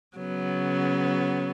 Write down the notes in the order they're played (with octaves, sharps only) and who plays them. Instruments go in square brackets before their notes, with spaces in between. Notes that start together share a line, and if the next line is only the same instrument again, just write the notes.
[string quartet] C#3 F#3 B3